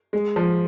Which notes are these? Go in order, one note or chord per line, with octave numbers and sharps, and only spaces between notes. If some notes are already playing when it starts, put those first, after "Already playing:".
G#3
F3